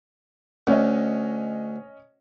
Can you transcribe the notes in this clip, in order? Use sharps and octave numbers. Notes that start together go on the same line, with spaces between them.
D2 C#4 C#5 D#5